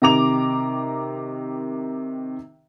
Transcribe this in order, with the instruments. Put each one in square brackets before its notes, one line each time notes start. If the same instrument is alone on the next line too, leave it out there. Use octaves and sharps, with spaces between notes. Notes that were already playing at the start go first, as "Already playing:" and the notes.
[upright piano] C3 D#3 A#5 D6 F7